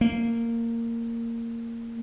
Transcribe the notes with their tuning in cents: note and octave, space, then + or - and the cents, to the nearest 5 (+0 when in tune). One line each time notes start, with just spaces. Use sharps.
A#3 -15